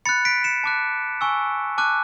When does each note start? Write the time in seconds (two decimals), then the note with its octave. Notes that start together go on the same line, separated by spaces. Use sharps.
0.05 B5 F#6 A6 C#7
0.25 B6 D7
0.44 C#7 E7
0.64 A5 D6 F#6
1.21 G#5 C#6 E6
1.78 A5 D6 F#6